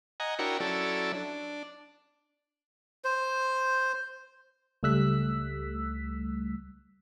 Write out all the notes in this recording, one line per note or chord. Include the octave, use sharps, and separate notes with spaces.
D#5 F#5 G#5 A#5
D4 E4 F#4 A#4 C#5 G5
F#3 C#4 E4 A4 D5
D4
C5
C#2 G3 A3 E6 F#6 B6